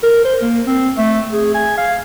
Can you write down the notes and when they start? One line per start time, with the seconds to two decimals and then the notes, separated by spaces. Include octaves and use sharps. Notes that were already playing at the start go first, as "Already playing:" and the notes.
0.03 A#4
0.24 C5
0.41 A#3
0.66 C4
0.98 A3
1.32 G#4
1.55 G#5
1.77 F5